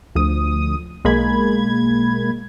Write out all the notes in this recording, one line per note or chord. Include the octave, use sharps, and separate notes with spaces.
D2 F3 D#6
B1 G#3 A#3 B5 G#6